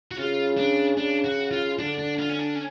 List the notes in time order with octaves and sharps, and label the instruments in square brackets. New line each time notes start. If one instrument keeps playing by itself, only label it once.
[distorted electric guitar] F#4
[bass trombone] C#3 [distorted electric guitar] F4
[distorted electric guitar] D4
[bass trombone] C#3 [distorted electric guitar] D4
[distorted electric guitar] F#4
F4
[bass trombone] D3 [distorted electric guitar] D4
[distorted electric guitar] D4
F4
C#4
D4
C#4